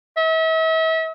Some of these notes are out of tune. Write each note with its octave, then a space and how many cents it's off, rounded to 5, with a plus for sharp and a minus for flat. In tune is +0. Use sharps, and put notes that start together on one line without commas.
E5 -40